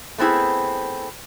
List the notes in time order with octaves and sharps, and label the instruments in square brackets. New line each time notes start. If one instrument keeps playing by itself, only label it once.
[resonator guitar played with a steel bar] A3 B3 C4 E4 G#4